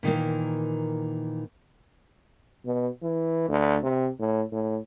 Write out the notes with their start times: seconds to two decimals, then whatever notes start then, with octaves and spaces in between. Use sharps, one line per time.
0.03 A#2 D#3 E3 A#3
2.66 B2
3.02 E3
3.48 D2
3.83 C3
4.19 A2
4.52 A2